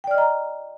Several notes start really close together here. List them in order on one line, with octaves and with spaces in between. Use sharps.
G5 D5 F6 D#5 A#5